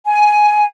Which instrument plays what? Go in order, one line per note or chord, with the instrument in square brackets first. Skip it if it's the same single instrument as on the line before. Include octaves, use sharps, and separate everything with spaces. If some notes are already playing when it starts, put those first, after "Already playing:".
[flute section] G#5